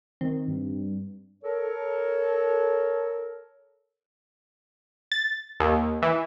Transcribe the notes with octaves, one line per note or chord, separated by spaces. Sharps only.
D#3 C4
G2
A4 A#4 C#5
A6
D#2
E3